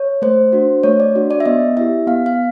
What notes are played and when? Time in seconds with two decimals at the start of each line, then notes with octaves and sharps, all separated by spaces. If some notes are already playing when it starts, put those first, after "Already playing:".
Already playing: C#5
0.22 A3 C5
0.53 D4 F#4
0.83 A3 C#5
1.00 D5
1.16 D4 F#4
1.31 D5
1.40 E5
1.46 B3 D#5
1.77 E4 G4 E5
2.07 B3 F5
2.26 F5